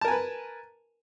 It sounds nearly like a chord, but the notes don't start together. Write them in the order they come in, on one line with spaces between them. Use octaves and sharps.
A5 A#4 G#5 B4